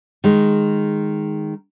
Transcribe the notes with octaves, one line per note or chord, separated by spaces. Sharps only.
D#3 G#3